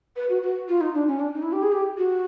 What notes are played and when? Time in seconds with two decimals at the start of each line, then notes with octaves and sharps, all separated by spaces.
0.16 B4
0.30 F#4
0.43 F#4
0.69 F4
0.81 D#4
0.94 D4
1.07 C#4
1.20 D4
1.34 D#4
1.43 E4
1.53 G4
1.63 G#4
1.72 G4
1.98 F#4